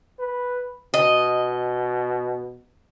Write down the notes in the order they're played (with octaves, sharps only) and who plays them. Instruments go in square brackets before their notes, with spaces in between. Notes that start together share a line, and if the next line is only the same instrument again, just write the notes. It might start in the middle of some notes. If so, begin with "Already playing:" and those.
[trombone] B4
[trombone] B2 [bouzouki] D#5